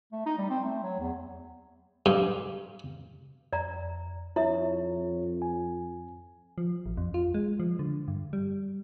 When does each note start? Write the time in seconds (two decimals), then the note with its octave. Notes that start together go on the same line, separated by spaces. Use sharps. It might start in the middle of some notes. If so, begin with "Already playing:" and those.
0.12 A3
0.26 D#4
0.38 G3
0.50 C4
0.64 A3
0.83 F#3
1.00 E2
2.06 G2
3.53 F2 D5 A#5
4.36 F2 E4 C#5 E5
5.42 G#5
6.58 F3
6.86 A1
6.97 F2
7.14 F4
7.34 G#3
7.60 F3
7.79 D3
8.08 G2
8.33 G3